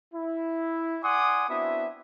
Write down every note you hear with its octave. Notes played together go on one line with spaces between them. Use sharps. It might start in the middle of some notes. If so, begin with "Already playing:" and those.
E4
D5 F#5 G#5 C6 D6 D#6
B3 C4 D4 E4 F#4 E5